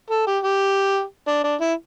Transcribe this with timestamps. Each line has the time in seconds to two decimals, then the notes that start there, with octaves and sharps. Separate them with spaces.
0.10 A4
0.27 G4
0.44 G4
1.27 D4
1.44 D4
1.60 E4